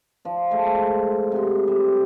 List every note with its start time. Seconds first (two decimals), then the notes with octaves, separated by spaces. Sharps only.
0.25 F3 D5
0.51 G#3 A3
1.32 C3 F#5 C6
1.68 G3